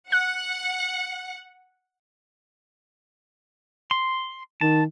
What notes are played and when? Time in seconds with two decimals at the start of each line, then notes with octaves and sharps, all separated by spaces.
0.12 F#5 F#6
3.91 C6
4.61 D#3 A5